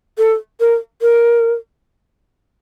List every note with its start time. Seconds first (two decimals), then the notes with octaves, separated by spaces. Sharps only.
0.18 A4
0.60 A#4
1.02 A#4